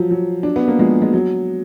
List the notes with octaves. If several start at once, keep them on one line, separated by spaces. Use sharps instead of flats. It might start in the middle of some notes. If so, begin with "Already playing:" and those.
Already playing: F3 F#3
F#3
D4
B3
A#3
F3 G#3
G#3
F#3